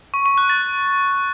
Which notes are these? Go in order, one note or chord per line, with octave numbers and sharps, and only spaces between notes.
C#6
C#6
F#6
A6